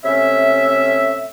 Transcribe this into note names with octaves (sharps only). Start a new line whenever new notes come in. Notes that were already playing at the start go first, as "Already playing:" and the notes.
C3 A3 C#4 C#5 E5